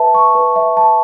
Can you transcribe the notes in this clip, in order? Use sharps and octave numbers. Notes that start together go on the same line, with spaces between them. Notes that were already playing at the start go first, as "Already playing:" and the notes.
Already playing: B4 E5 A5
C#6
B4
E5
A5